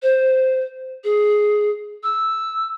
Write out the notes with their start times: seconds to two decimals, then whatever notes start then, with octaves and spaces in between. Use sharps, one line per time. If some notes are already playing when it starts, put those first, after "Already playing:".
0.02 C5
1.04 G#4
2.03 E6